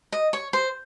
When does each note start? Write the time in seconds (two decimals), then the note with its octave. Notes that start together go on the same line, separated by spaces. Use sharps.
0.12 D#5
0.33 C#5
0.53 C5